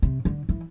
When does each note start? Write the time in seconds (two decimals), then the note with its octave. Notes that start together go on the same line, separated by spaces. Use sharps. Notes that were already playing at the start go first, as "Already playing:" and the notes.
0.02 C3
0.25 D3
0.49 E3